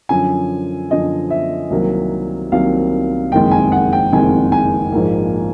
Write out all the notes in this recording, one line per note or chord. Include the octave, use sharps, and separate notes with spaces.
F#2 D3 F3 G#5
F#2 D3 F3 D#5
E5
C2 C3 D#3 F#3 A#3
C2 C3 D#3 F#3 A#3 F5
F#1 F2 C3 D#3 G#3 G5
G#5
F#5
G5
F#1 F2 C3 D#3 G#3 G#5
G#5
A#1 G#2 F3 A#3